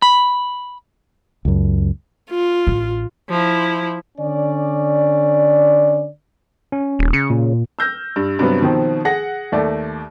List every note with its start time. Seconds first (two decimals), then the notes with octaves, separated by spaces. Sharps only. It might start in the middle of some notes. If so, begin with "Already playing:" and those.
0.02 B5
1.45 C#2 F#2
2.30 F4
2.67 A1
3.29 F3 E4
4.18 D3 C#4 D5
6.72 C#4
6.99 D#1
7.13 C#3 C#7
7.30 A#2
7.79 E6 F6 G6 A#6
8.16 G2
8.39 G2 C3 F#3 G3 B3
8.61 B2 D#3 F3 C4
9.05 G#4 F#5 A#6
9.52 D#2 A3 D5